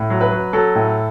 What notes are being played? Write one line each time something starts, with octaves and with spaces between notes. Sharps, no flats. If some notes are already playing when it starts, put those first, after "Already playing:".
Already playing: A2
F#3
B4
F#3
F#3 A4
A2